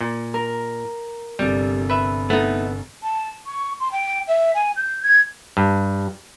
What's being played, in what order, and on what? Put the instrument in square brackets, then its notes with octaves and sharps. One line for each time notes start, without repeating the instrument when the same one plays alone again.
[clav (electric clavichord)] A#2
[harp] A#4
[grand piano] G1 C3 [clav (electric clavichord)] G3
[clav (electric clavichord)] B4 E5
[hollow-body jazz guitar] A3 D#4 [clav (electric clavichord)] B3
[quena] A5
C#6
C6
G5
E5
G#5
G6
G#6
[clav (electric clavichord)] G2